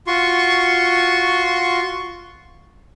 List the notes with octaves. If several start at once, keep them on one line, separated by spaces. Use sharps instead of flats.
F4 F#4 C6 C#6